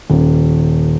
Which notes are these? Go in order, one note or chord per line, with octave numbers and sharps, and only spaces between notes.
D#1